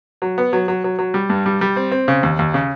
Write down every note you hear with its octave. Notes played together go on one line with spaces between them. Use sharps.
F#3
B3
F#3
F#3
F#3
F#3
G3
G2
G3
G3
C4
C4
C#3
D#2
D#2
C#3